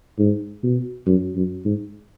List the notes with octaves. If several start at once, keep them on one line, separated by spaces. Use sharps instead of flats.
G#2
B2
F#2
F#2
G#2